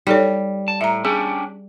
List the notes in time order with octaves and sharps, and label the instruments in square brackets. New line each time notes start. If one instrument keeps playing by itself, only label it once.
[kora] G3 [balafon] D#4 A4 C#5
[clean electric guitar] A5
[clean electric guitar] A2 [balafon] E5 A#5
[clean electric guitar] C#4 D4 G4 [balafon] G#4